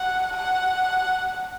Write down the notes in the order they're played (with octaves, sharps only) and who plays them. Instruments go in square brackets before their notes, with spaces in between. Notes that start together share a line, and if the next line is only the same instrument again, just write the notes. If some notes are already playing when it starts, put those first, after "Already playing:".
Already playing: [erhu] F#5
F#5